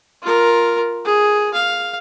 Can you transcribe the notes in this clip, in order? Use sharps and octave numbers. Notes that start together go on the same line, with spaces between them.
F4 A#4
G#4
F5